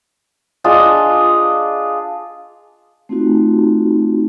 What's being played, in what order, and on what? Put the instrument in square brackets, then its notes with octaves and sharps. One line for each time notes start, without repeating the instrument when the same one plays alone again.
[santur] D4 F4 G#4 D#5
[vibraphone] A3 C4 D#4 F4 F#4